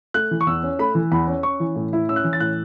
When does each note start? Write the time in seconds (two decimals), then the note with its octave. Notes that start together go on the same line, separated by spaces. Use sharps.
0.14 A3 F#6
0.31 E3
0.41 C#6
0.47 E2 E6
0.63 C#4
0.79 A3 B5
0.95 E3
1.12 E2 B5
1.27 C#4
1.43 C#4 C#6
1.60 E3
1.76 A2
1.93 E4
2.09 C#4 E6
2.16 F#6
2.24 E3
2.33 A6
2.40 A2 F#6